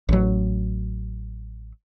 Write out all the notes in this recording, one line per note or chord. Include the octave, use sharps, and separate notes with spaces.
A1 F#3